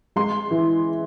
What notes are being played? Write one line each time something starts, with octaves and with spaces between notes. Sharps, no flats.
G#3 C6
E3